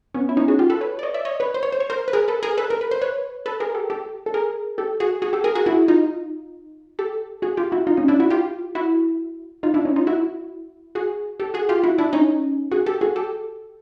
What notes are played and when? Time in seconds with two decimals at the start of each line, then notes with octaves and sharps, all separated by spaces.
0.14 B3 C#4
0.29 E4
0.37 C#4 D#4
0.48 F#4 G#4
0.59 F4 G4
0.70 A4 B4
0.81 B4 C#5
0.99 D5
1.03 C#5 D#5
1.14 D5 E5
1.25 C#5 D#5
1.40 B4 C#5
1.54 C5
1.63 C#5
1.72 C5
1.80 C#5
1.90 A#4 C5
2.08 B4
2.13 G#4 A#4
2.28 A4 B4
2.43 G#4 A#4
2.57 A4 B4
2.70 A#4
2.81 B4
2.91 C5
3.01 B4 C#5
3.46 A4 B4
3.60 G#4 A#4
3.75 G4 A4
3.90 G4 A4
4.26 A4
4.34 G#4 A#4
4.78 G4 A4
5.00 F#4 G#4
5.22 F#4 G#4
5.33 G4 A4
5.44 G#4 A#4
5.55 F#4 G#4
5.66 E4 F#4
5.88 D#4 F4
6.99 G4 A4
7.42 F#4 G#4
7.57 F4 G4
7.72 E4 F#4
7.87 D#4 F4
7.97 C#4 D#4
8.08 D4 E4
8.20 E4 F#4
8.30 F4 G4
8.75 E4 F#4
9.63 D#4 F4
9.74 D4 E4
9.85 C#4 D#4
9.96 D#4 F4
10.07 E4 F#4
10.95 F#4 G#4
11.40 G4 A4
11.54 F#4 G#4
11.69 F4 G4
11.84 E4 F#4
11.98 D4 E4
12.13 C#4 D#4
12.71 F#4 G#4
12.86 G4 A4
13.01 F#4 G#4
13.16 G4 A4